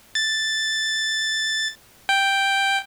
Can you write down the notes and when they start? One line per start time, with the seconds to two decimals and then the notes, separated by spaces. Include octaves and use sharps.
0.15 A6
2.09 G5